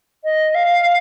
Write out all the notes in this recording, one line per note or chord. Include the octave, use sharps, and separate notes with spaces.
D#5
F5